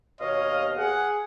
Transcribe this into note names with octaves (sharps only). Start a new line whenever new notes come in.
D#2 B2 C#5 D#5 F5
G#4 F#5